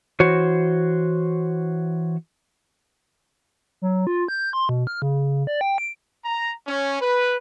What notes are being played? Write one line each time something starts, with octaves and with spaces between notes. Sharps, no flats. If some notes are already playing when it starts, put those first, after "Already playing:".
E3 F#4 C5 C#5
F#3
F4
G6
C6
B2
F6
C#3
D5
G5
D7
A#5
C#4
B4